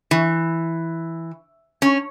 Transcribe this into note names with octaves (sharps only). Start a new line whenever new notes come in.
E3
C#4